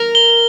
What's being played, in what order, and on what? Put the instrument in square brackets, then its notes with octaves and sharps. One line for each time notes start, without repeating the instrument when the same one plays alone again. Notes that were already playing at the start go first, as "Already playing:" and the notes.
Already playing: [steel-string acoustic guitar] A#4
[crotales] G7